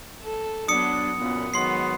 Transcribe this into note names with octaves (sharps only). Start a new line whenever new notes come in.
A4
F#3 B3 D4 D#6 C#7
F#2 A#2 B3
D#3 F#3 G#3 B3 C6 C7